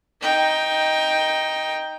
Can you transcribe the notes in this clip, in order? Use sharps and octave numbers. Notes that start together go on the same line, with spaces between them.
D#4 G5